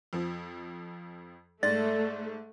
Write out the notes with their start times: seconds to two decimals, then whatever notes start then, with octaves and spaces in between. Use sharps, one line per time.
0.13 F2 F3
1.63 G#2 A3 D5 A6